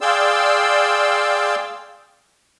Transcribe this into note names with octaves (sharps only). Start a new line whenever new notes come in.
G#4 D5 F5 G5 C6 E6